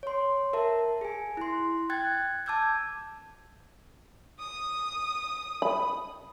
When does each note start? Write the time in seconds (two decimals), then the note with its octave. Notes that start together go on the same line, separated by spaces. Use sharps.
0.03 C#5 C6
0.53 A#4 E5 A5
1.01 G#4 G#5
1.37 E4 C6
1.90 G5 F#6 G#6 A6
2.46 A5 D6 E6 G6 G#6
4.40 D#6
5.62 B5